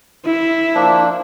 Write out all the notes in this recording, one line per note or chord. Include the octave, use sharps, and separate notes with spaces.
E4
F3 A#3 D4